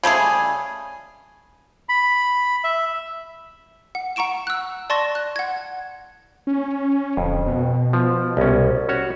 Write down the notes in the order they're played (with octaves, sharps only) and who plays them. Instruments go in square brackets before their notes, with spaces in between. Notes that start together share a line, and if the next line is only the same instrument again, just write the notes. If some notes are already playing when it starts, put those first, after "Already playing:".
[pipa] C#3 G3 A3 G#4
[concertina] B5
E5
[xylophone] F#5
F#5 A#5 C#6 D7 E7
E6 F#6
D5 A5 C6 C#6 A6 A#6
F#6
F#5 G#6
[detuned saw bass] C#4
[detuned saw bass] D1 [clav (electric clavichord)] F2
[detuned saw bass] B2
[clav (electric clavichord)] F3
C2 C#4
C#4 F#4 C#5